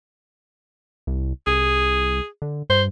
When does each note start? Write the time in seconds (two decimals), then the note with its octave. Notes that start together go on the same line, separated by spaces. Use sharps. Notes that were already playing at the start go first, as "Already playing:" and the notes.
1.07 C2
1.47 C2 G#4
2.42 D3
2.70 G2 C5